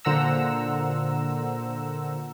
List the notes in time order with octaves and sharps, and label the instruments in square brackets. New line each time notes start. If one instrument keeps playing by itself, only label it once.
[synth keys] A#2 D3 C5 F#5 A#5 E6